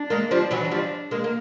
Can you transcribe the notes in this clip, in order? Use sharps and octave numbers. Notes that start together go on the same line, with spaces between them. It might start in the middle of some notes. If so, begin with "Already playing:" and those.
Already playing: D4
G#3 A#3
F3 G3 D4
E3 F#3
F#3
F3 G3
G#3 A#3
A#3